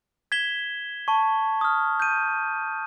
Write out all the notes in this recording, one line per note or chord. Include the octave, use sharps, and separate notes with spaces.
G#6 B6 E7 G7
A5 C#6
D#6 F6
G6 D#7